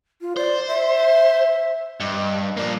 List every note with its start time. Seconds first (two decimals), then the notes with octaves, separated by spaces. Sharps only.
0.21 F4
0.37 C5 D5
0.68 E5
2.00 G2 D#5
2.57 F3 A#3 D5